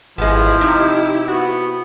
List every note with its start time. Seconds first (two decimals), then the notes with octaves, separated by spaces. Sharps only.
0.18 G#1 F3 G#3 B3 E4 G4
0.61 C3 D#4
1.28 B3 F#4